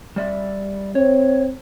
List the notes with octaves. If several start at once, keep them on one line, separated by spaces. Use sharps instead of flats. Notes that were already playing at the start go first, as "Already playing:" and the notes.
G3 D5 E5
C4 C#5